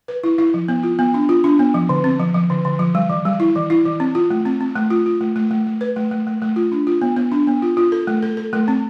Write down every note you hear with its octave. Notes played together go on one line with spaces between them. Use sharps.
B4
E4
E4
F3
B3
F4
B3
D4
F4
D4
B3
F3
D3
C4
F3
F3
D3
D3
F3
G3
E3
G3
E4
E3
E4
E3
C4
F4
A3
C4
C4
A3
F4
F4
A3
A3
A3
A3
B4
A3
A3
A3
A3
F4
D4
F4
B3
B3
D4
B3
F4
F4
A4
A3
A4
A4
A3
C4